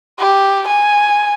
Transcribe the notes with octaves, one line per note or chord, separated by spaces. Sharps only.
G4
G#5